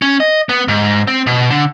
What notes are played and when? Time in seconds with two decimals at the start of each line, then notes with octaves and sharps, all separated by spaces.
0.02 C#4
0.20 D#5
0.49 B3
0.68 G#2
1.07 C4
1.27 B2
1.50 D3